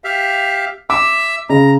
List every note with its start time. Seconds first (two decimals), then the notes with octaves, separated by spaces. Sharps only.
0.04 G4 E5 F5
0.90 E5 D6 E6
1.50 C#3 A#5